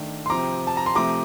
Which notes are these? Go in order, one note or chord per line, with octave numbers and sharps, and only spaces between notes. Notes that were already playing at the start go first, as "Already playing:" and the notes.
Already playing: D#3 A3 D4
C6
C3 F3 C4 A#5 D6
A5
A#5
C6
C3 F3 A3 A#5 D6